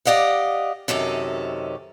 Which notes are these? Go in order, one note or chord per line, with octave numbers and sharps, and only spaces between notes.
G4 D5 D#5 F5 F#5
F#2 C3 D#3 C#4 A4